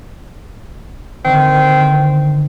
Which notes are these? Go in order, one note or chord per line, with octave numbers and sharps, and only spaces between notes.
D3 D#3 C4